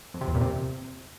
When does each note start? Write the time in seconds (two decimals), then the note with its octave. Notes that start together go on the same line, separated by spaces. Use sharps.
0.14 F2
0.21 C3
0.28 E2
0.34 A#2
0.41 C3